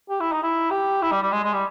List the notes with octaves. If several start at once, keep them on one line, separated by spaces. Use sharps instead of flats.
G4
E4
D#4
E4
G4
E4
G3
G3
G#3
G#3
G3